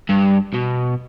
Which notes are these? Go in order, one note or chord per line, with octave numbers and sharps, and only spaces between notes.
G2
B2